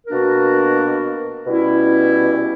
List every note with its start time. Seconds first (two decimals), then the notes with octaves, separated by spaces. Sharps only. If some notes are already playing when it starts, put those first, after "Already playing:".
0.07 B2 A#3 D4 F#4 A#4
1.46 B2 G3 C#4 E4